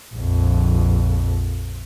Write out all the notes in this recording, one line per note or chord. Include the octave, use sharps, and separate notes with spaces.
A#1 F2